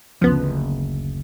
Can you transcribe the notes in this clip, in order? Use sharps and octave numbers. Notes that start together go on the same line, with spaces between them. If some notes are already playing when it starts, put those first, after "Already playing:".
F#1 D2 F3 B3